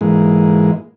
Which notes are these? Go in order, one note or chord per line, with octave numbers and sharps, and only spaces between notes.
G#2 E3 G#3 A#3